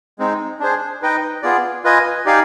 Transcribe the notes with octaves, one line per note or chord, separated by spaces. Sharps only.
G#3 C4 D#4
D4 G#4 C5
D#4 B4 D#5 G5
B3 F4 G#4 D5
F4 B4 D#5 G#5
D#4 G4 D5 F5 G#5